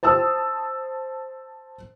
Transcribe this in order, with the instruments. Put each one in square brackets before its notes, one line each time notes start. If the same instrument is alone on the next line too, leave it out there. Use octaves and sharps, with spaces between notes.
[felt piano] C5 A5 D#6 E6